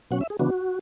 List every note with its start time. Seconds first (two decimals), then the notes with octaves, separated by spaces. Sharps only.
0.11 B2 F#3 C#4 F#5
0.21 E5
0.30 G#4
0.39 C#3 E3 B3 D4 F#4